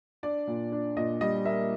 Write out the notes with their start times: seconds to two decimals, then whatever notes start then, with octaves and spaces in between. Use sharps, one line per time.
0.23 D4 D5
0.47 A#2
0.72 D4
0.97 A#2 D#5
1.21 G3 D#5
1.45 A#3 E5